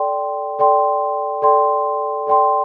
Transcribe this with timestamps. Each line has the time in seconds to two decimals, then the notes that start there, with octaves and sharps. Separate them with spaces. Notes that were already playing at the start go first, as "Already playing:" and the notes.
Already playing: A4 D5 G5 C6
0.59 A4 D5 G5 C6
1.42 A4 D5 G5 C6
2.27 A4 D5 G5 C6